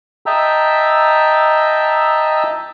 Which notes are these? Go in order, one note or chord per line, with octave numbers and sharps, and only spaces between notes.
D#5 E5 G5 A5 A#5 E6